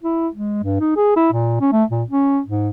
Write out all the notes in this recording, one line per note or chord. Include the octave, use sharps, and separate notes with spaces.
E4
G#3
G2
D#4
G#4
E4
A#2
C#4
A3
A#2
C#4
G#2